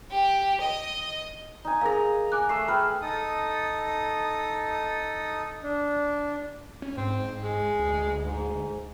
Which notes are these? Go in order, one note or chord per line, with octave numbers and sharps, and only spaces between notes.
G4
D#5
D#4 G#5
G#4 A#4 D#5 F5 A#5
G#5 D6 F#6
A3 E5 C7
G#4 B4 G5 F6
D#4 A4 D#6
D4
C#4
G#2 C4
G#3
D2
G#2